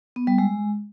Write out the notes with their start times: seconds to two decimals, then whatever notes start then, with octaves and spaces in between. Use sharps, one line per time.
0.16 B3
0.27 G3
0.38 G#3